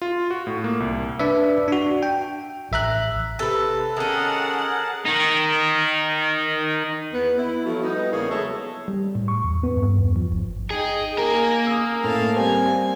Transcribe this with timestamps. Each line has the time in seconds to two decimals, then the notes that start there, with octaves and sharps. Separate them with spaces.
0.02 F4
0.31 F#4
0.47 A2
0.64 A#3
0.80 C2
1.20 D4 B4 D5 E5
1.68 D4 F#4
2.03 G5
2.72 A1 E5 A#5 F#6
3.39 C3 A4 B4
3.97 D#3 C#4 G#4 A#4 F#5 A5
5.06 D#3 D#4
7.13 E2 B3
7.38 E4
7.65 F3 F#3 A3
7.82 G3 B3 D#4
8.13 E2 C#3 A#3 G#4 C#5
8.31 F#3 G#3 B3 A4 C#5 E5
8.88 G3
9.15 A2
9.28 C#6
9.44 E2
9.63 B3
9.77 G2
9.98 E2
10.16 F3
10.32 G#1
10.70 D#4 G#4 G5
11.18 A#3 G#4 A#4 G#5
11.67 D#6 E6
12.04 A2 F5 A5
12.36 G3 C4 G#5